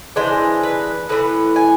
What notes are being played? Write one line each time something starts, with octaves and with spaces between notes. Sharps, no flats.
E3 G#3 D4 C5
B4
A2 E3 B3 B4
G#5